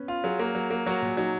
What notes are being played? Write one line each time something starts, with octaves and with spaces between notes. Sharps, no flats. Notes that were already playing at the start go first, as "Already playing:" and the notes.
Already playing: B3 C#4
F4
F#3 G#4
A#3
F#3
A#3
F#3 F#4
A#2
F#3 D#4